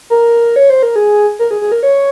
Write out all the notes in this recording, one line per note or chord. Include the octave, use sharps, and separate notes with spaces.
A#4
C#5
C5
A#4
G#4
A#4
G#4
G#4
A#4
C#5